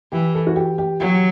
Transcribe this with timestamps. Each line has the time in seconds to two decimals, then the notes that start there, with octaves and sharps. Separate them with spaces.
0.12 E3 G4
0.34 A4
0.47 F#4
0.56 G4
0.78 G4
1.00 F#3 G4